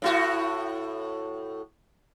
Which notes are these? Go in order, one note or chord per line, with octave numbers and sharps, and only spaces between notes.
A2 E4 F#4